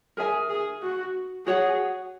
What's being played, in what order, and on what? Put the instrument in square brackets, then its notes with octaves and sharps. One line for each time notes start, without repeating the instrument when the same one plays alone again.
[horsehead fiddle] G#4 [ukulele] A#4 E5 G#5
[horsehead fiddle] G#4
F#4
[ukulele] F#4 C#5 F#5 [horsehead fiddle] G#4